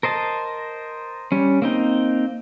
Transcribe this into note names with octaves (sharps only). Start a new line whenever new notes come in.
A#4 C5 D#5 A5
G3 C#4
A#3 C4 D#4